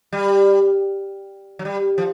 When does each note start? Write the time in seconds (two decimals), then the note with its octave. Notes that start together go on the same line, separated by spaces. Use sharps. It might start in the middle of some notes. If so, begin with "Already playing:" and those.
0.13 G3
1.59 F#3
1.65 G3
1.98 F3